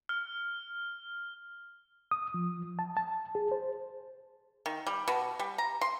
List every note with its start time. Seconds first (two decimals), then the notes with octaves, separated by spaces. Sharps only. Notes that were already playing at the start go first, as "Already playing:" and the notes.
0.09 F6
2.11 D#6
2.34 F3
2.79 A5
2.97 A5
3.35 G#4
3.51 C5
4.66 D#3
4.87 G3
5.08 B2
5.39 G3
5.58 A#5
5.81 C6